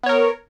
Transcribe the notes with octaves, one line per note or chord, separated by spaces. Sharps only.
B3 A#4 C#5